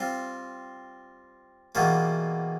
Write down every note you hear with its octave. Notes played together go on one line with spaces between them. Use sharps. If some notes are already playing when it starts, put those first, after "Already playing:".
Already playing: G3 C4 F4
E2 B2 G3 A#3